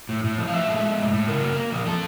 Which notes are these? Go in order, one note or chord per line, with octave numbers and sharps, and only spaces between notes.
A2
A2
F3
F5
A2 E5
G#3
G#3
A2
A2
C#3 A#4
A#3
A#3
F3
F3 A4